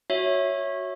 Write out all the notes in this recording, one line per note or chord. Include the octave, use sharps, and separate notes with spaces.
F#4 C#5 E5